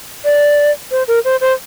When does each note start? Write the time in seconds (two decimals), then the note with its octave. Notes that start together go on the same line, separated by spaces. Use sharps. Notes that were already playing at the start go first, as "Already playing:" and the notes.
0.25 D5
0.91 C5
1.08 A#4
1.25 C5
1.41 C5